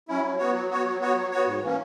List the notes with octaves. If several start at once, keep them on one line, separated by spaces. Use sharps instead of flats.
F#3 C#4 E4
F#3
B3 F#4 C#5
F#3
B3 F#4 C#5
F#3
B3 F#4 C#5
F#3
B3 F#4 C#5
G#2
E3 A#3 C#4